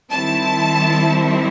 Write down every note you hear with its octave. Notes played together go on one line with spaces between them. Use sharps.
D#3 G3 C4 E4 A5